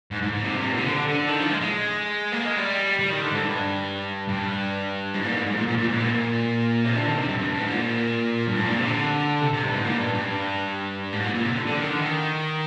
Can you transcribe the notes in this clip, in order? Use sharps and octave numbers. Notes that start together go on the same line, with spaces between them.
G#2
G#2
G#2
C3
G2
G#2
A#2
C3
D3
D3
D#3
F3
G#3
G#3
A#3
G#3
G3
G3
D#3
D3
G#2
G2
G2
G#2
A#2
G#2
G#2
A#2
A#2
A#2
G#2
A#2
C3
D3
D#3
C3
G2
G2
G2
G#2
A#2
G2
G#2
A#2
C3
D3
C3
C3
G2
G#2
A#2
G2
G2
G#2
A#2
A#2
C3
D3
D3
D#3
D3
D#3